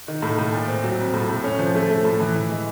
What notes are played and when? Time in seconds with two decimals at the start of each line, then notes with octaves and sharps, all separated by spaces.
0.08 D#3
0.22 A2
0.38 A2
0.53 A#2
0.68 C4
0.84 F#3
0.99 F2
1.14 A2
1.30 A2
1.44 C#4
1.59 F3
1.75 A3
1.90 A3
2.05 A2
2.20 E3
2.35 E3
2.51 G#3